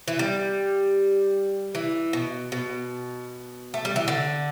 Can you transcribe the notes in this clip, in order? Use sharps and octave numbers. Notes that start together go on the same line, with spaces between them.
E3
G3
E3
B2
B2
A3
G3
E3
D3